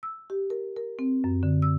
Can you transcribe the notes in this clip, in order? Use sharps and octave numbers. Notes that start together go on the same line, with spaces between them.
E6
G4
A#4
A#4
C4
F#2
D3
E6